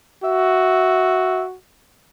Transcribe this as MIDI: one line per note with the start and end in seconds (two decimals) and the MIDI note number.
0.24 1.56 66
0.24 1.43 76